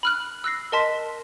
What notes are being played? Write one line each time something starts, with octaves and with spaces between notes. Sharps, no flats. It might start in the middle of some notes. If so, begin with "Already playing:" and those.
B5 F6 F#6
E6 F#6 A#6 C7
A#4 D#5 A5 C6 B6